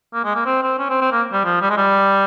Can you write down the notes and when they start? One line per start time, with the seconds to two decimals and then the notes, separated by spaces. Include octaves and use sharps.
0.14 A#3
0.25 G#3
0.35 A#3
0.46 C4
0.63 C4
0.79 C#4
0.90 C4
1.02 C4
1.12 A#3
1.33 G3
1.45 F3
1.62 G3
1.70 G#3
1.78 G3